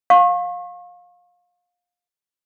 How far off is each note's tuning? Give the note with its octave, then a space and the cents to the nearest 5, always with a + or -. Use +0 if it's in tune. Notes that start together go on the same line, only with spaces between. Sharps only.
F5 +25 C#6 -40